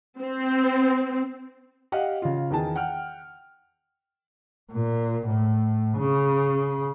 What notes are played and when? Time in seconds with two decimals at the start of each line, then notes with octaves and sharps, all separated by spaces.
0.20 C4
1.92 G4 D#5 F5 F#5
2.22 C#3 F4
2.51 E2 D#3 G#4 A5
2.76 F#5 G5 F6
4.72 A#2
5.27 A2
5.98 C#3